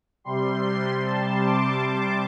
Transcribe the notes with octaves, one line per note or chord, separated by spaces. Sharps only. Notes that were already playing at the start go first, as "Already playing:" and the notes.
C3 G3 C6
A5
D6